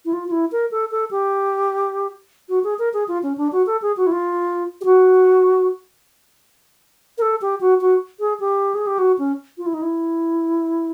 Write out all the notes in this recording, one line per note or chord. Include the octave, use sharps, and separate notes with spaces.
E4
F4
F4
E4
A#4
A4
A4
G4
F#4
G#4
A#4
G#4
F4
C#4
D4
F#4
A4
G#4
F#4
E4
F4
G4
F#4
A#4
A4
G4
F#4
F#4
G#4
G4
G#4
G4
F#4
C#4
F4
E4
D#4
E4